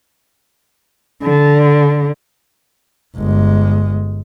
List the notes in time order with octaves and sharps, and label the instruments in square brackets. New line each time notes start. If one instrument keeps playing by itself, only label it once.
[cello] D3
[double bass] G1 G#3